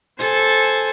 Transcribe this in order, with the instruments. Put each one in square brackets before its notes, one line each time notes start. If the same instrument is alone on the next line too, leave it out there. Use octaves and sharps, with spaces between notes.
[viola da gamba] A4 [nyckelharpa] C5 G#5